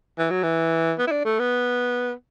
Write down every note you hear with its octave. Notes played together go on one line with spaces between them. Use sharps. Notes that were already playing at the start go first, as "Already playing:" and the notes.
E3
F#3
E3
B3
E4
D4
A3
B3